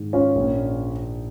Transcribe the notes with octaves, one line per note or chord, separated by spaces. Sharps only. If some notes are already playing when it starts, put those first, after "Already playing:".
Already playing: G#2 D#3
C#4 F4
A#1 A#2 A#3